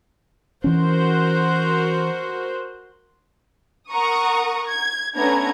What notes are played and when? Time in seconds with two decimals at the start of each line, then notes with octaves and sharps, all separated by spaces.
0.64 E3 C#4 F#4 A#4 C5
3.90 A#4 F#5 A#5 C#6 D#6
4.68 G#6
5.16 A3 B3 C#4 D4 A#5 G#6